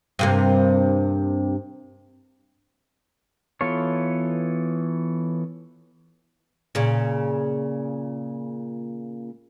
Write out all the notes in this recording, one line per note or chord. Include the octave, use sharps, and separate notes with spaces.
G2 C3 A#3
E3 B3 F4 A4 C#5
A#2 C#3